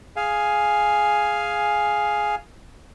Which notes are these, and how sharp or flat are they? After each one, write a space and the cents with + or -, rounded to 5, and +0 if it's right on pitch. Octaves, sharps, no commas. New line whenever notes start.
G#4 +0 F5 +0 G#5 +0